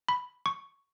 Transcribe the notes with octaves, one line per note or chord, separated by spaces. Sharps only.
B5
C#6